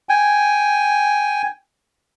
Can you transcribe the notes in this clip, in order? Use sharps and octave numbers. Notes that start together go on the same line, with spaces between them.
G5 G#5